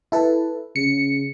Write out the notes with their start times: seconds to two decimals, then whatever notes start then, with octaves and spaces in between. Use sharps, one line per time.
0.12 E4 A4 B4
0.76 C#3 C#7